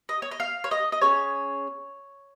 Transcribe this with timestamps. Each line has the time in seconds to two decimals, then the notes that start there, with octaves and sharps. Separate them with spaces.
0.09 D#5
0.22 C#5
0.31 D#5
0.40 F5
0.64 C#5
0.71 D#5
0.92 D#5
1.01 C#4 G#4 C#5